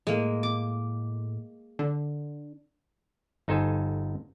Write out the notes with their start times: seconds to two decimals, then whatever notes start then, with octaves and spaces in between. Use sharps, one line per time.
0.07 A2 G#3 A#3
0.43 D6
1.79 D3
3.48 G1 D#4 A4 C5 G#5